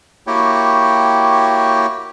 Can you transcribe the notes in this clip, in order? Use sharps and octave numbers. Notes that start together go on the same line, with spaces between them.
A#3 E4 F#4 G4 C#5 G5